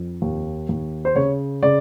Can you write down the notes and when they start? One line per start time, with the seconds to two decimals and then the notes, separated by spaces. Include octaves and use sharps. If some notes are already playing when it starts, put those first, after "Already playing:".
Already playing: F2
0.22 D#2
0.69 D#2
1.05 C5
1.15 C#3 C#5
1.63 C#3 D5